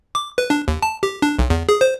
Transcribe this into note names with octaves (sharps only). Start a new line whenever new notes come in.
D6
B4
D4
D#2
A5
G4
D4
B1
E2
G#4
C5